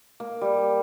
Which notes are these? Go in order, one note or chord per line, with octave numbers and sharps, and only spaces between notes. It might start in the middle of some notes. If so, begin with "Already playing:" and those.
A#3
G3